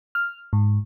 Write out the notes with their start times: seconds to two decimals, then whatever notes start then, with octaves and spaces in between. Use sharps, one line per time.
0.15 F6
0.53 G#2